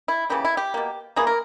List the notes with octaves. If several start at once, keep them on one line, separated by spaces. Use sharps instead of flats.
E4
C#3 E3 A#3 G4
E4
G4
B2 A#3
E3 A#3 G#4
A#4